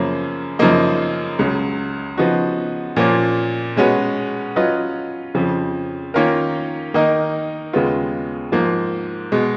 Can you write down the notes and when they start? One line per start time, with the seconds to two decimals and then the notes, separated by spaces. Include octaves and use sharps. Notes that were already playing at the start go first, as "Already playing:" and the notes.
Already playing: F#2 C#3 F3 A#3 C#4
0.59 F#2 C#3 F3 A#3 D#4
1.39 C#2 C#3 F#3
2.18 C#3 F3 B3 D#4 F#4
2.96 A#2 F3 A#3 C#4
3.76 B2 G#3 C#4 F#4 B4
4.56 F#3 C#4 F4 B4 D#5
5.35 F2 C#3 F3
6.14 D#3 A#3 C#4 F4 A#4
6.94 D#3 A#3 D#4 A#4 D#5
7.73 D#2 C#3 G#3 B3 F4
8.52 G#2 F3 A#3
9.32 B2 G#3